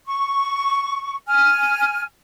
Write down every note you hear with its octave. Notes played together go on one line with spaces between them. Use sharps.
C#6
G#5 F6